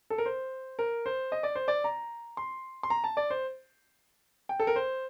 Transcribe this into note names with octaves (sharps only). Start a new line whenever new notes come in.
A4
A#4
C5
A#4
C5
D#5
D5
C5
D5
A#5
C6
C6
A#5
A5
D5
C5
G5
A4
A#4
C5